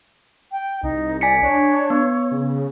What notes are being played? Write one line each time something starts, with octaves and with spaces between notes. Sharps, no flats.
G5
C2 D#4
D5 G#5 B6 C#7
D4 C#5
B3
C#3